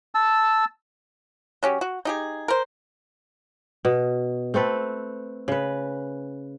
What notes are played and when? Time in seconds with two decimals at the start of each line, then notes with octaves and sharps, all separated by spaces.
0.15 A5 E6
1.63 F#3 C#4 G4
1.81 F#4
2.05 D#4 G4 G#4
2.48 A#4 C5
3.85 B2
4.54 A3 C4 A4 B4
5.48 C#3 B4